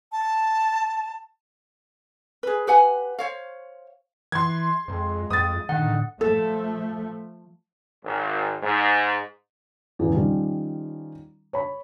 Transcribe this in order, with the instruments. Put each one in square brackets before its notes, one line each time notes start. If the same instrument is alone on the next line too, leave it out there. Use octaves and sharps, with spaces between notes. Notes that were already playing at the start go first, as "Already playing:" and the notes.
[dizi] A5
[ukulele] G#4 B4
G4 B4 F#5 G#5
C5 C#5 F5
[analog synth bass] E3 [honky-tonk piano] C6 G#6
[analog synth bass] F2 [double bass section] G#3
[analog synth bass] F2 [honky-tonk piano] D#6 A6
[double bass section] A2 D3 [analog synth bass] D#3 [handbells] F#5
[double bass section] F3 A3 [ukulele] A4
[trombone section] G#1
G#2
[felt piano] E2 G#2 C#3 E3
D#3 F3 G3 C#4
C#5 B5